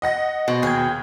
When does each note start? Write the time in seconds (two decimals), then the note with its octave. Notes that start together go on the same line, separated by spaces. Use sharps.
0.02 D#5 F#5 A#6
0.48 B2 C5
0.62 D#2 G#4 G5 G#6